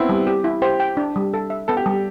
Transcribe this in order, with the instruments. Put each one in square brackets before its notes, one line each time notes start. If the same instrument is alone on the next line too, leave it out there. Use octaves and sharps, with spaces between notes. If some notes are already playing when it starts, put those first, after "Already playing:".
Already playing: [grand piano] B3 C4 E4
[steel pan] G3
G4
E4
[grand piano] G4 [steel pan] C5
[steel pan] G5
D4
G3
A4
E5
[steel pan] B3 [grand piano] A4
[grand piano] G4
[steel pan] G3